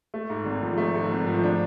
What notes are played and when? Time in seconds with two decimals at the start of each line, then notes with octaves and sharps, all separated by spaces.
0.14 A3
0.30 G#2
0.45 G#1
0.62 F3
0.77 A3
0.95 G#2
1.11 G#1
1.27 F3
1.43 D4